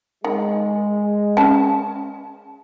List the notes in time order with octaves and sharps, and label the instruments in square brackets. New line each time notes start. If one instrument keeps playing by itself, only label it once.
[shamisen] D#3 [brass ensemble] G#3
[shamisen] C#4 A5